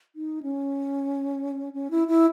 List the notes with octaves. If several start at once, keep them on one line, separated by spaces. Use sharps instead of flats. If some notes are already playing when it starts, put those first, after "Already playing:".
D#4
C#4
C#4
E4
E4